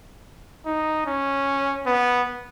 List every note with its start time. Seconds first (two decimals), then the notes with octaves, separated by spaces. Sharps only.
0.66 D#4
1.06 C#4
1.87 B3